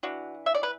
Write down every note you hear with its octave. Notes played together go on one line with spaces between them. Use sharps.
E3 D4 F#4
E5
D5
B4